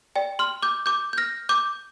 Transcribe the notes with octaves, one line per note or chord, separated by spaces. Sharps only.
D5 G5
C6 F6
D6 G6
D6 G6
G6
F6 A#6
D6 G6